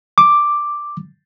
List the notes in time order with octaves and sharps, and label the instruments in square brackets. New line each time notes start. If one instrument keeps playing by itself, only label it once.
[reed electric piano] D6